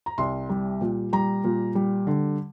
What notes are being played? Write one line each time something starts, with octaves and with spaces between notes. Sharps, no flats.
A#5
C2 C6
G3
A#2
G3 A#5
A#2
G3
D3